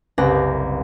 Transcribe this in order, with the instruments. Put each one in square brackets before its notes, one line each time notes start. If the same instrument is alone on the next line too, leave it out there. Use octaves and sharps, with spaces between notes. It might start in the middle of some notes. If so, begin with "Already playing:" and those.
[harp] F#1 C2 G4 B4 A#6